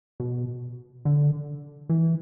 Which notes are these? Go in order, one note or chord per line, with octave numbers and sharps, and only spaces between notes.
B2
D3
E3